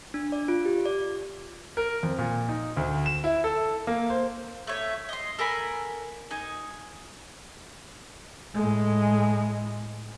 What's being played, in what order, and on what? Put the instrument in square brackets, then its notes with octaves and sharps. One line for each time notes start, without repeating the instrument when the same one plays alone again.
[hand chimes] D4
D5
F4
G4
D5
[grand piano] A#4
F2
A#2
D#4
D2
E7
E4
A4
A#3
C5
[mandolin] A3 C#5 E5
D#5 C6
A4 A#4 G#5 B5
D#4 G#5
[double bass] A2 G#3